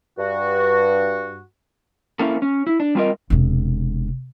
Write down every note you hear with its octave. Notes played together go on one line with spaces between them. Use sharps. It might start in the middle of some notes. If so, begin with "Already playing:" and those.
G2 F#4
A#3 C#4 E4 A4
C#4
E4
D4
G3 C4 F4 G#4 A#4 D#5
E1 C3